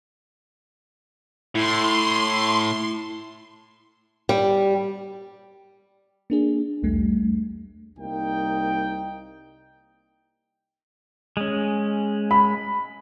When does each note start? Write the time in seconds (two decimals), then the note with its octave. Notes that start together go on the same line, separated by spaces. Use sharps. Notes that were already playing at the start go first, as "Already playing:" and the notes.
1.55 A2 E4 C6 C7
4.29 G3
6.30 A#3 D4 G#4
6.83 B1 E2 G3 A3
7.99 C2 A#3 D#4 G5
11.37 G#3 C#4
12.31 B5